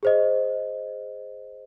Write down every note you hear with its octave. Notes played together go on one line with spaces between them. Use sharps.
G#4 C5 D#5